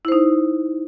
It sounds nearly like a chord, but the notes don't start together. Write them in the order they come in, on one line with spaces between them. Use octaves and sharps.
E4 C5 D#4